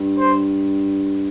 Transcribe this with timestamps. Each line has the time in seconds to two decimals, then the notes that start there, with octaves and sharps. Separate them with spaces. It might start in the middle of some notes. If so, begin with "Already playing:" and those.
Already playing: G2
0.18 C5